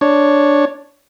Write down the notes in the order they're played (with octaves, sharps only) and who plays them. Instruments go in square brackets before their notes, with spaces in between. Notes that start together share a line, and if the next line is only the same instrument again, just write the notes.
[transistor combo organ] D4 C#5